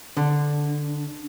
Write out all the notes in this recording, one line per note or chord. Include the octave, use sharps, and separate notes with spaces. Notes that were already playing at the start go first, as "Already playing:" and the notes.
D3 D4